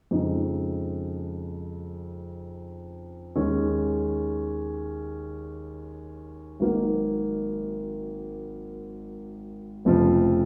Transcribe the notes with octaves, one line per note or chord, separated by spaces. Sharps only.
F2 C#3 G#3 D#4
D#2 D#3 G#3 C#4
G#1 G#2 F#3 A#3 D#4
F1 F2 C#3 F3